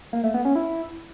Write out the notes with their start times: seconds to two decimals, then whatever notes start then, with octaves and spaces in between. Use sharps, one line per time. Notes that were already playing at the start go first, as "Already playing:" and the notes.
0.13 A#3
0.24 A3
0.34 B3
0.45 C#4
0.56 E4